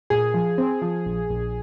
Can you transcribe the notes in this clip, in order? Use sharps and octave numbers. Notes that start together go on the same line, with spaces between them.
A#2 G#4
F3
C4
F3
A#1
A#1